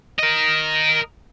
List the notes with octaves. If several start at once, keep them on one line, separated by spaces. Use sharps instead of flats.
A#4 D#5